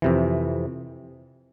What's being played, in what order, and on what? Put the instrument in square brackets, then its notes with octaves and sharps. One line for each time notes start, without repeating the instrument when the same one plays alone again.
[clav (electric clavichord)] F2 C3 E3